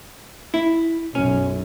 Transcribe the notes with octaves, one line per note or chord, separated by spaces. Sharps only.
E4
B1 F#2 C#4